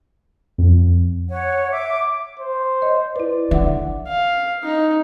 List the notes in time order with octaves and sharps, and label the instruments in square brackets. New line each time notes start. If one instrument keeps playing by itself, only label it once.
[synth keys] F2
[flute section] C#5 F#5
E5 D6
[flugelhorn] C5
[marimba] C#5 D#5
[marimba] E4 B4 [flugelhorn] D5
[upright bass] D3 [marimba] E5 F#5
[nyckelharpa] F5
D#4